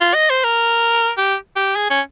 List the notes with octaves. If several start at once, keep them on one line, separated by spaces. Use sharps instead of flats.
F4
D#5
C5
A#4
G4
G4
G#4
C#4